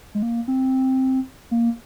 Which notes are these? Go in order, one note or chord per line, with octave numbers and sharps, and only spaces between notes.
G#3
A#3
C4
A#3